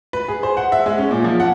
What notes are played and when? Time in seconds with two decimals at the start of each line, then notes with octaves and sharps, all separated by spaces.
0.13 B4
0.28 G#4
0.43 C5
0.57 F#5
0.72 E5
0.86 G#3
0.98 C#4
1.11 A#2
1.24 F3
1.40 F#5